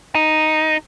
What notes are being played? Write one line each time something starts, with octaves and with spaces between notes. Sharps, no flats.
D#4